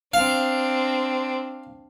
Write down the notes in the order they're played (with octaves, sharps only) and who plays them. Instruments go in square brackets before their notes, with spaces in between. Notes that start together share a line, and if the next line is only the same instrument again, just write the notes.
[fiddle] C4 D4 [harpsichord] F5